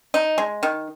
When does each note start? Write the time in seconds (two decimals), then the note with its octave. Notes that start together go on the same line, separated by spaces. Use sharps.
0.14 D#4
0.38 G#3
0.63 D#3